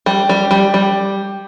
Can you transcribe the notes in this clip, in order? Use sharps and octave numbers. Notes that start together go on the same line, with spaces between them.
G3
G3
G3
G3